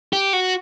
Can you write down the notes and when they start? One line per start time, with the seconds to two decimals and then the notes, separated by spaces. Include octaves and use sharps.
0.13 G4
0.33 F#4